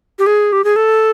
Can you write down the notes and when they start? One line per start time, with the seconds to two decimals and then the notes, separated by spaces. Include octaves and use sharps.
0.19 G4
0.26 G#4
0.53 G4
0.64 G#4
0.76 A4